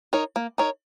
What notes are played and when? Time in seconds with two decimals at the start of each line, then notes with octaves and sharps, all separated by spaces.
0.13 D#4 A#4 C#5
0.36 A#3
0.58 D#4 A#4 C#5